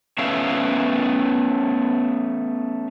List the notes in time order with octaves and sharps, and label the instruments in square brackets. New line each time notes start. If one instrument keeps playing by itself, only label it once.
[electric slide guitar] A3 B3 C#4 E5 F5